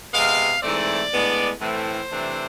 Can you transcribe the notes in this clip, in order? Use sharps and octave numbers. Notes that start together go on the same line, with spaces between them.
C3 G#3 B3 F5
G#2 E3 A3 C4 D5
A2 G#3 B3 D4
A2 E3 A3 C4 C5
C3 E3 A3 D4